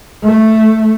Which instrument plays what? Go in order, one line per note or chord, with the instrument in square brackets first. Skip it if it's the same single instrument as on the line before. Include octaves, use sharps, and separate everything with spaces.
[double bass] A3